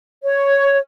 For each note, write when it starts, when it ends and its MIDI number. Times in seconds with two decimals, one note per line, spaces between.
0.24 0.78 73